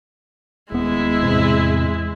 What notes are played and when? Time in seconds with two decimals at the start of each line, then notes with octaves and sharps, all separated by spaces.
0.72 D#1 G#3 B3 E4
1.23 E2 A2 C3